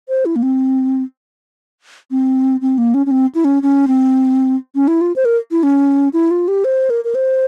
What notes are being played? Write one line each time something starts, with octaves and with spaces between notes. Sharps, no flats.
C5
E4
A#3
C4
C4
C4
A#3
C#4
C#4
C4
E4
C#4
C#4
C4
C#4
E4
F4
C5
A#4
E4
C#4
E4
F4
G4
C5
A#4
A#4
C5